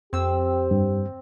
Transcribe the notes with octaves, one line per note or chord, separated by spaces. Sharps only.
F2 C4 G4 E6
G2